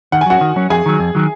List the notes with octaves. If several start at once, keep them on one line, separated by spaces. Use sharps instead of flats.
D#3 F#5
G#5
F#3 C#4 F#4 F#5
D#3
F#3 C#4
F2 G#4 G#5
D#3 F#3
F2
D#3 F#3